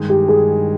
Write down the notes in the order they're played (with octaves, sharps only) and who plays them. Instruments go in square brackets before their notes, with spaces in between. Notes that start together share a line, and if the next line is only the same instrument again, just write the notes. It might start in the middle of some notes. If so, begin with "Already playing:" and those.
Already playing: [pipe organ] G2 D#3 G#3
[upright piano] G4
G#4